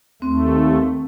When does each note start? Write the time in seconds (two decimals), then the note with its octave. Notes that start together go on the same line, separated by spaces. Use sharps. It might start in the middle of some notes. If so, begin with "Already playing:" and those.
0.22 D#2 A3 C4